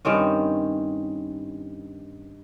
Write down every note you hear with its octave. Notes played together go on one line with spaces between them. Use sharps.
G2 D#3 C4 C#4